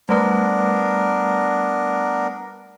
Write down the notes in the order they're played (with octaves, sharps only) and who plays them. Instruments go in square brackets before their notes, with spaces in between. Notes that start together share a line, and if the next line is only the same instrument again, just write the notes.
[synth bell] G3 A3 B4 [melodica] B3 D4 A#4